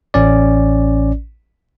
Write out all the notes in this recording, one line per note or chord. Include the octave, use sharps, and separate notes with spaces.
A1 C#4 D5